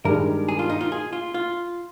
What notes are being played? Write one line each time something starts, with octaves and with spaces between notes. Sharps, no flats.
G2 D#3 G#3 A#4
G#4
F4
D#4
F4
G#4
F4
F4